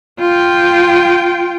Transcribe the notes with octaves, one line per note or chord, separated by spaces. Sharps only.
F4 G5